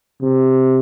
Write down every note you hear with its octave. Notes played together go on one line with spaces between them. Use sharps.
C3